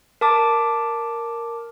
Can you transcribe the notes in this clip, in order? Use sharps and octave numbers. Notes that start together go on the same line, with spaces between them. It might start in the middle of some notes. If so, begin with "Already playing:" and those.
A#4 A5 D6